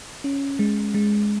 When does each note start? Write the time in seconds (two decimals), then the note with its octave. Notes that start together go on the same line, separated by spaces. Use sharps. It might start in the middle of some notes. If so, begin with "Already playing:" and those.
0.24 C#4
0.59 G#3
0.94 G#3